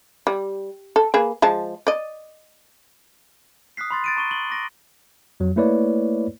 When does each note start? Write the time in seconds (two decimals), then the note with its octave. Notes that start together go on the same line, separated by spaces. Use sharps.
0.27 G3
0.96 A4
1.14 A#3 G#4 B4
1.42 F3 G#3 A5
1.87 D5 D#5
3.77 D#6 F6 F#6 B6 C7
3.90 B5 C6 A6
4.04 A6 D7 D#7
4.16 A#5 C#6 D#7 G7
4.31 F#7 G7
4.50 D6 A#6 D7
5.40 F2 F#3
5.56 A3 A#3 E4 B4 C#5 D5